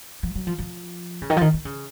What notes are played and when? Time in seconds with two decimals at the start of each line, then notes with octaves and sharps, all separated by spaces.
0.23 F3
0.35 F#3
0.47 F3
0.58 F3
1.22 C#3
1.30 D#3
1.37 F3
1.41 D#3
1.54 D#3
1.65 C#3